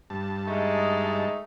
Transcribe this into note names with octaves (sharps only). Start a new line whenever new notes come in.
G2 A5
G#3 A3 D#4